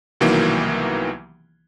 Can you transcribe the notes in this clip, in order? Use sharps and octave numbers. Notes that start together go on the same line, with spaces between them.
C2 B2 D#3 E3 F#3 A#3